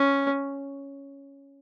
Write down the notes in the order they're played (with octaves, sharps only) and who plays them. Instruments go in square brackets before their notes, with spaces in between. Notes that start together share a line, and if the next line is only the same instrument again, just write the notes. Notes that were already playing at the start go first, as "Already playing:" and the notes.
Already playing: [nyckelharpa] C#4